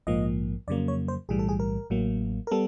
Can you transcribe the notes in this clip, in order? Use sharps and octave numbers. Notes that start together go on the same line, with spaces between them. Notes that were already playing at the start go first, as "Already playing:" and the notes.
A#1 G#2 F3 A#3 D#5
F2 C#3 F#3 A#3 D5
C#5
C5
B1 A2 E3 G3 G#4
A4
G#4
A#4
A1 A2 F#3 A#3
A#4
G3 B3 A4